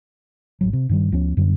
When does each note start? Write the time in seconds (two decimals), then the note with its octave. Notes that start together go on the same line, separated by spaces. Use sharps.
0.61 G#1 D#2 F#3
0.73 C3
0.89 G2 D#3 G3
1.12 D2 F3 B3 C#4
1.37 F#2 D3 G3 B3